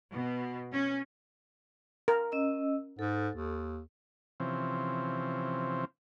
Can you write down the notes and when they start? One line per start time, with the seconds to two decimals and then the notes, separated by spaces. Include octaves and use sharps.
0.14 B2
0.73 C#4
2.08 A#4
2.32 C#4 D#5 E6
2.99 G#2 A4
3.35 D#2
4.40 C3 E3 F3 C4 C#4